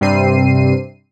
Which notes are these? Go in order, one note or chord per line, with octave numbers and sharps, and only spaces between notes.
G2 C3 G3 C4 C7 D#7